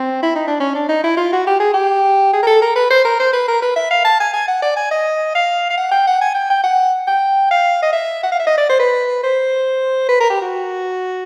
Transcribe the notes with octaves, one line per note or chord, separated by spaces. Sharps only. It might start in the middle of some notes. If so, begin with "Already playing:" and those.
Already playing: C4
E4
D#4
D4
C#4
D4
D#4
E4
F4
F#4
G4
G#4
G4
G#4
A#4
A4
A#4
B4
C5
A#4
C5
B4
A#4
B4
E5
F5
A5
G#5
G#5
F#5
D5
G#5
D#5
F5
F5
F#5
G5
F#5
G#5
G5
G5
F#5
G5
F5
D#5
E5
F#5
F5
E5
D#5
D5
C5
B4
C5
B4
A#4
G4
F#4